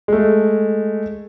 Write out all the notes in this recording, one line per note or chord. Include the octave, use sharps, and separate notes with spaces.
G#3 A3